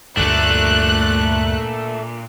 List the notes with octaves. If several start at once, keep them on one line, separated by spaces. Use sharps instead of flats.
D2 G2 A#2 A3 D4 F#6